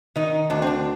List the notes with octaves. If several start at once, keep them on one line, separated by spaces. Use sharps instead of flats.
D#3 D#4
D2 D4
C4
D4